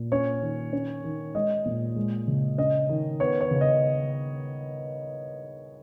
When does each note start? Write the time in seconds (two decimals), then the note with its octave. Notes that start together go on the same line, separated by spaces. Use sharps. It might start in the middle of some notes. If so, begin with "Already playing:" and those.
Already playing: A#2
0.12 C#4 C#5
0.42 D#3
0.73 C#4
1.04 D#3
1.35 G#3 D#5
1.66 A#2
1.96 G#3
2.27 C#3
2.58 C#4 D#5
2.89 D#3
3.20 B3 C#5
3.41 C#5
3.51 C#3
3.61 D#5